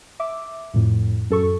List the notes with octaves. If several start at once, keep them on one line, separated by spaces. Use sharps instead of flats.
E5 D6
F2 A2
F#2 A4 C#6